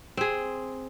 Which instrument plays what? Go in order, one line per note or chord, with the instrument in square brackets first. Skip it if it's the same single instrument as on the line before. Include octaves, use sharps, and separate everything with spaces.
[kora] C4 G#4